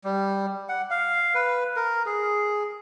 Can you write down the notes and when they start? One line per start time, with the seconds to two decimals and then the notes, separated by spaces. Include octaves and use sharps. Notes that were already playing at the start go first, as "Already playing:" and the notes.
0.04 G3
0.69 F#5
0.90 F5
1.35 B4
1.76 A#4
2.06 G#4